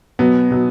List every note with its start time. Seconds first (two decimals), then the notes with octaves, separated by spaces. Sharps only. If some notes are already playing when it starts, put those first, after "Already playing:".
0.19 B2 F#3 B3
0.51 B2 F#3